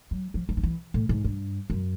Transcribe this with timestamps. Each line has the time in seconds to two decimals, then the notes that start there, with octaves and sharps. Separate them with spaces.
0.11 F#3
0.34 F3
0.49 E3
0.57 D#3
0.63 E3
0.94 A2
1.09 G#2
1.24 G2
1.70 F#2